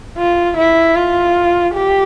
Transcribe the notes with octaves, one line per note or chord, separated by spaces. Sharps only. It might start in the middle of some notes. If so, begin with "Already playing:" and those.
F4
E4
F4
G4